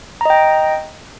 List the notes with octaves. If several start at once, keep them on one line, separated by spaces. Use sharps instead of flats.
D#5 G5 A#5